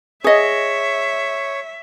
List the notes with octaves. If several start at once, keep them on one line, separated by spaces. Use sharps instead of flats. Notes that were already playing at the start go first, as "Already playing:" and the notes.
G#4 C#5 D#5 E5